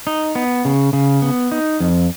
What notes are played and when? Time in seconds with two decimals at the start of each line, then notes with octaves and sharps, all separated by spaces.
0.07 D#4
0.35 B3
0.65 C#3
0.93 C#3
1.22 B3
1.52 D#4
1.80 F2